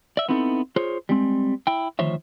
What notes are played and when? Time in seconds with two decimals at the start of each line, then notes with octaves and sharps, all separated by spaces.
0.17 D5 E5
0.29 B3 C4 D#4 E4 F#4 A4
0.76 F4 G#4 C5 C#5
1.09 G3 G#3 C4
1.67 E4 G5
1.99 D2 D#3 F3 C5 C#5 E5